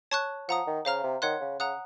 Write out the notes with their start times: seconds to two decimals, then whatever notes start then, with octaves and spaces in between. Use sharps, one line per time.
0.11 C#5 A5 C#6 F#6
0.48 F3 F#5 A#5 D#6
0.67 D#3
0.85 C#3 C5 F5 A#5 F6
1.04 C3
1.22 D#3 C#5 F#5 C6 F#6
1.41 C#3
1.59 C#3 F#5 A#5 D#6 F#6